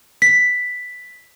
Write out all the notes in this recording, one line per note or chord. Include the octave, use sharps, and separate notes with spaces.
B6